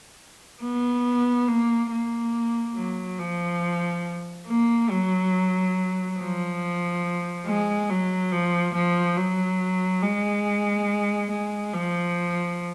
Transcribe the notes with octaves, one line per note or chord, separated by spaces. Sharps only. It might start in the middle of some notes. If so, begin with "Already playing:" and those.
B3
A#3
A#3
F#3
F3
A#3
F#3
F3
G#3
F#3
F3
F3
F#3
G#3
G#3
F3